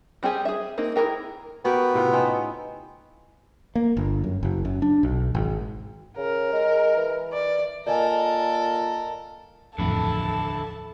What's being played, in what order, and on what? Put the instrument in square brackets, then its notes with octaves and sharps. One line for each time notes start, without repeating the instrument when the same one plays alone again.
[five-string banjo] G3 C4 G4 G#4 G#5
G#4 E5
A#3 C4 D#4
E4 F4 G#4 A#4 G5
[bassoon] B3 [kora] F#4 G4 A#4
[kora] A2 C3 F4
C4 C#4 D#4
[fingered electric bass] A#3
G1
F#2
F#1
F#2
D4
B1
G#1
[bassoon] C#3 [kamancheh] A#4
[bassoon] G#3
E3
[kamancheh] D5
[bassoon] A#2 [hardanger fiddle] A4 A#4 [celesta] D5 D#5 G#5
[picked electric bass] D#1 A1 F2 [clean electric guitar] D3 E4 [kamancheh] A4 A5